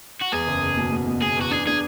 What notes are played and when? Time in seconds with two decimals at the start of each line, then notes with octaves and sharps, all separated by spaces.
0.21 F#4
0.32 E2 G#4
0.47 F#1
0.62 F#1
0.77 B2
0.92 B2
1.06 B2
1.21 B2 G#4
1.37 E2 F#4
1.51 D4 G#4
1.67 D4 G#4